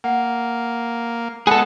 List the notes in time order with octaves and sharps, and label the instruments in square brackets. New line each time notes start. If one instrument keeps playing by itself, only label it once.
[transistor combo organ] A#3 [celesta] F#5
[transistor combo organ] G#3 B3 F#5 [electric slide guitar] G#4 A4 [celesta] B5 D#6